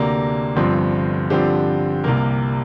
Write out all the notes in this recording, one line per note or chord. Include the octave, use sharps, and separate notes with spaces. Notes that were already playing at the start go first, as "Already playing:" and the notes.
Already playing: D2 C3 A#3 D4 A#5
G1 G2 F3 C4
G2 D3 F3 C4 G4 C5
C2 C3 A#3 A#4